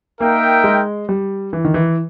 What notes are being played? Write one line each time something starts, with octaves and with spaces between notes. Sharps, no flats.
A#3 D#4 A#4 E5 G5
G#3
G3
E3
D#3
E3